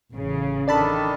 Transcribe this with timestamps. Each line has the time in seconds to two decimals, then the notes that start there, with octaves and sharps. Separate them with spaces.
0.12 A1 C#3
0.68 D#3 D4 A4 D5 A5 B5